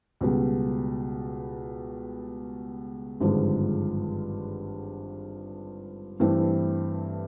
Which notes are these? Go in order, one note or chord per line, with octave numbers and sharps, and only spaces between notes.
C#2 B2 G3
G#1 G2 D3 F3 G#3
G2 E3 A3 C4 E4